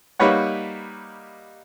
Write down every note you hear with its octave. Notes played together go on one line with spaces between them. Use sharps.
G3 A#3 D#4 B4 C#5 F#5